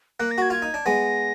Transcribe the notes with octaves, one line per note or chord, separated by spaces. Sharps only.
A#3 F#6
A#6
F#4 G#6
F4 G#6
D#4
D4
G#3 B3 A#6